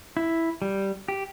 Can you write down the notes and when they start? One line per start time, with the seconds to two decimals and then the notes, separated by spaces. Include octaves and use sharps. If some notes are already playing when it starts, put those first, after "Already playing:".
0.17 E4
0.62 G3
1.08 G4